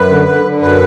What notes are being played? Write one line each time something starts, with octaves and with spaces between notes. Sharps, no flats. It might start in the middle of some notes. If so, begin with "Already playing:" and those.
Already playing: F#2 B4
D3
D3
D3
F#2 B4